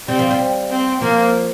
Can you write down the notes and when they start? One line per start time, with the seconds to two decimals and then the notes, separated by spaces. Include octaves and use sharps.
0.08 G3 C4
0.19 F3
0.31 G3
0.71 C4
1.01 F3 A#3